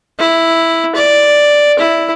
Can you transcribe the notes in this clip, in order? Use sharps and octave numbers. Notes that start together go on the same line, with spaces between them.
E4
D5
E4